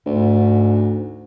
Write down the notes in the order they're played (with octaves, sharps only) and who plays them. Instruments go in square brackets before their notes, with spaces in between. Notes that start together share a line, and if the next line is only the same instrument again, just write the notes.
[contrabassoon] D2 [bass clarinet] G#2